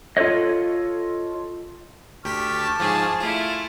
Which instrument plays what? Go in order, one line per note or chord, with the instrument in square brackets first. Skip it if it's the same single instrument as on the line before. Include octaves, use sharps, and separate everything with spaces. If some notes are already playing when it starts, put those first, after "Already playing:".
[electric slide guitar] F4 A4 B4 C#5 D#5
[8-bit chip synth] D2 G4 B6 [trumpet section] A5 [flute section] C#6 D6 F6
[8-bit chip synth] G#2 F3 [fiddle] G#4
[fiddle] A3 E4 [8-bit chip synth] F4